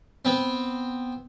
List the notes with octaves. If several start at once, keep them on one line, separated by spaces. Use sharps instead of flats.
B3 C4